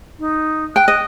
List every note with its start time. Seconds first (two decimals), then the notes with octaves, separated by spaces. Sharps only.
0.19 D#4
0.76 G5 F#6
0.88 D#5